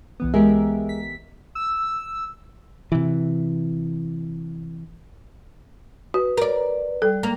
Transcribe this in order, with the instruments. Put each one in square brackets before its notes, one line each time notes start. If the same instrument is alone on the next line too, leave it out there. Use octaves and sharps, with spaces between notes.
[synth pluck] C2 E3 B3
[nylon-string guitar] G#3 [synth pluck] G4 A#4 E5
[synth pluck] B6
[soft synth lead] E6
[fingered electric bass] C3 E3
[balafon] F#4 [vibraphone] B4
[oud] A#4 D5
[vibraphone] G3 G5 [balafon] A4
[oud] A#3